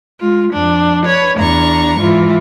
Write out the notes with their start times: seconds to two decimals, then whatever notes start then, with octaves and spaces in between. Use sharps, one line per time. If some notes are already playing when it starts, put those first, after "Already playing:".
0.21 G#3 F4
0.53 F2 D4
1.06 B4 C#5
1.38 E2 D4 A#5 C#6
2.00 G#2 E3 F4